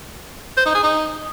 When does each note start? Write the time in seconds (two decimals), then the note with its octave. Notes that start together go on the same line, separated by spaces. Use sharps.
0.57 C5
0.66 D#4
0.75 G#4
0.83 D#4